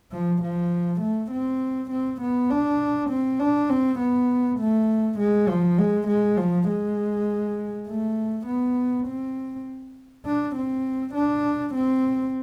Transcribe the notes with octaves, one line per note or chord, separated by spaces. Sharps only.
F3
F3
A3
C4
C4
B3
D4
C4
D4
C4
B3
A3
G#3
F3
G#3
G#3
F3
G#3
A3
B3
C4
D4
C4
D4
C4